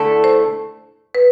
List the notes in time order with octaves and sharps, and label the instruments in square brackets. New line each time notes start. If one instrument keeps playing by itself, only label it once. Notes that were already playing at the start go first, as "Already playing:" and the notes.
Already playing: [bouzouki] D3 A3 E4 A4
[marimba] C5
B4